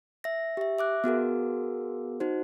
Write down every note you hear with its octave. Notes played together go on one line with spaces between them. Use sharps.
E5 A#6
G4 E5
E5 D6 F#6
B3 F#4 G#4 A#4
D#4 F#4 C5